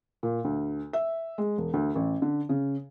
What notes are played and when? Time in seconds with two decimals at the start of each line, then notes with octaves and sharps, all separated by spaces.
0.23 A#2
0.45 D2
0.93 E5
1.38 G#3
1.58 E1
1.74 D2
1.95 A1
2.22 D3
2.49 C#3